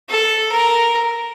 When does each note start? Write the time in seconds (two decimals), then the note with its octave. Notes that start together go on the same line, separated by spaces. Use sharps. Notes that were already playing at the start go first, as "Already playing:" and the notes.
0.09 A4
0.52 A#4